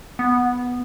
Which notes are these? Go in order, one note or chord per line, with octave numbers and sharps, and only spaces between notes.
B3